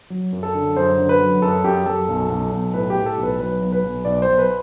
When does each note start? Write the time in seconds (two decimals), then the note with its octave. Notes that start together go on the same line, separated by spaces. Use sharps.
0.10 F#3
0.32 F#2
0.43 A4
0.54 D3
0.76 F#2 C5
0.98 D3
1.09 B4
1.21 F#3
1.42 F#2 A4
1.64 F#2 G4
1.86 F#2 A4
2.09 B1
2.30 B1
2.52 B1
2.74 A2 B4
2.90 G4
2.95 A2
3.06 A4
3.17 B1
3.23 B4
3.39 F#3 B4
3.61 B1
3.72 B4
3.84 B1
4.05 B1 D5
4.22 C5
4.28 B1
4.38 B4